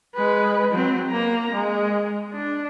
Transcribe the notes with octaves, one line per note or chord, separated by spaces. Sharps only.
G#3 B4
F#3 C4
A#3 A#5
G#3
D4